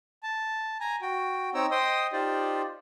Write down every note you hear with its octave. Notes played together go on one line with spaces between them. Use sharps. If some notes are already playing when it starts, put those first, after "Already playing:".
A5
G#5 A#5
F#4 G5
C4 D#4 C#5 G5 A#5 E6
C5 D#5 G5 C6 D#6
D#4 F4 G4 C5 D5